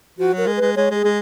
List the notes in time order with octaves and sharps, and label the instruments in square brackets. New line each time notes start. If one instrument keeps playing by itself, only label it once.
[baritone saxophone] F3 [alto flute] F#4
[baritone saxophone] F#3 [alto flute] A#4
[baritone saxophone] G#3
[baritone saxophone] G#3 [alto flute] B4
[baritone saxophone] G#3 [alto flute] C#5
[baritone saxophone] G#3 [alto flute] G#4
[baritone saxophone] G#3